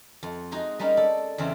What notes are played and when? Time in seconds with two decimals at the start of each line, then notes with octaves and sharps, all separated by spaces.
0.23 F2
0.51 G#3 D#4 F#4 G#4
0.79 G3 G#3 A#3 C#4 D#4
0.97 A4 D5
1.38 E2 C#3 E3 C4 C#4